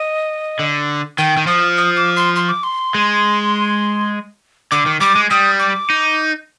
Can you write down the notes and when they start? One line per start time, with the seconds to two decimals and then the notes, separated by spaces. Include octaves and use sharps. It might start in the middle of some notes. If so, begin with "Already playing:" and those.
Already playing: D#5
0.59 D3
1.18 D#3 G5
1.37 D#3
1.47 F3 D#6
1.77 D#6
1.97 D6
2.17 C6
2.36 C6
2.49 D6
2.63 C6
2.95 G#3
4.71 D3 D6
4.86 D#3
5.00 G3 D6
5.15 G#3
5.31 G3 D#6
5.60 D6
5.90 D#4